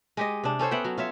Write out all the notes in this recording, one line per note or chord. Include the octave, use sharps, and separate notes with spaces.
G#3 G4 D#5
C3 D4
C#4 A4 C5 C#5
B3 E5 F#5 G5
F#3
F4 C#5 E5